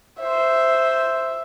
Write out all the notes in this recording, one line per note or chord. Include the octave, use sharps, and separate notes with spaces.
C5 E5